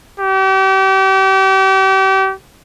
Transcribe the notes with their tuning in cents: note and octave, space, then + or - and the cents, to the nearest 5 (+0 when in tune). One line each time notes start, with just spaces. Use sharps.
G4 -35